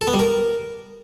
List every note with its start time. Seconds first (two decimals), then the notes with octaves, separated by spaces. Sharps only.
0.01 A4
0.07 B3
0.13 G3
0.19 A#4